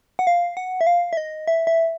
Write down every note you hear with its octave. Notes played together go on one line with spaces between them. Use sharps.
F#5
F5
F#5
E5
F5
E5
D#5
E5
E5